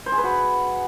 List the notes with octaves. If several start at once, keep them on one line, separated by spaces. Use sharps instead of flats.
C5
G#4
B4
F#4